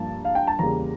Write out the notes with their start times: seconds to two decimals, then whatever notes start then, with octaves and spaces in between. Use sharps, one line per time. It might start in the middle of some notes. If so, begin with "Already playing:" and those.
Already playing: G2 F3 A#3 A5
0.25 F5
0.35 G5
0.47 A5
0.59 E2 C#3 G3 A#3 A#5